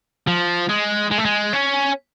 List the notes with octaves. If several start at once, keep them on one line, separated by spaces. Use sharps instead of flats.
F3
G#3
G#3
A3
G#3
C#4